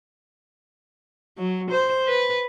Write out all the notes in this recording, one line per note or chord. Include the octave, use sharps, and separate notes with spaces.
F#3
C5
B4